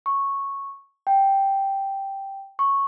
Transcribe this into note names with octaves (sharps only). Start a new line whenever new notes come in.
C#6
G5
C#6